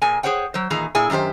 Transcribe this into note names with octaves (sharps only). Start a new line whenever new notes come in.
A#2 A#3 G#4 G#5
G#4 C5 C#5 F#5 G5
F#3 C5
A#2 D#3 E3 G#4 A#5
A#2 E4 G#4 G#5
F#2 D#3 C4 G4 C5